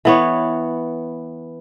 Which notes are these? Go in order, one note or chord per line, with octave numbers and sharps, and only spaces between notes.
E3 B3 C#5